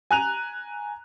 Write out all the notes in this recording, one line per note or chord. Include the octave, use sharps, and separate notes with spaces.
G#5 A#5 F#6 D#7 F7